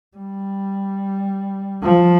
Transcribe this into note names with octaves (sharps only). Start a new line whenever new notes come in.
G3
F3